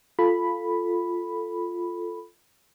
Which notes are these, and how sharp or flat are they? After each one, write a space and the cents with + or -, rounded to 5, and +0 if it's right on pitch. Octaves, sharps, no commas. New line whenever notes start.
F4 +0 A4 +0 B5 +0